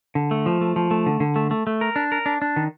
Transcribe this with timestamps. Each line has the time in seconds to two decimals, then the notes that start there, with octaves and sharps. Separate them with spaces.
0.15 D3
0.31 A3
0.46 F3
0.61 A3
0.76 F3
0.91 A3
1.06 D3
1.20 D3
1.36 A3
1.51 A3
1.67 A3
1.81 A#4
1.96 D4
2.12 A#4
2.26 D4
2.42 D4
2.56 D#3